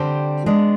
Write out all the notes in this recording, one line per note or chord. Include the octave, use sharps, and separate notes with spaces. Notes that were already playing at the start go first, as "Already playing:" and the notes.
Already playing: D3 G3 C4 G4 C5
G#3 B3 D4